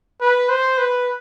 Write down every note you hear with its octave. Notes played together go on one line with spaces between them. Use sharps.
B4
C5
B4